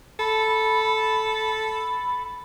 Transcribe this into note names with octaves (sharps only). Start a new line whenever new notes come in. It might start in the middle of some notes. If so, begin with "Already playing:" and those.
A4 B5